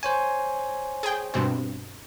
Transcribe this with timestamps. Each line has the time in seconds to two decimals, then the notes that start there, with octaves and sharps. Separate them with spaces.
0.03 C5 C#5 G#5
1.03 G#4 G5
1.34 G2 B2 C4